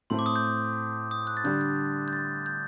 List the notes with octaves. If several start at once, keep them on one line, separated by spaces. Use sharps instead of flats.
A2 A3 C4 C6
D6
D#6
G6
D#6
F#6
A6
D3 G3 D4 G6
G6
G6
A6
G6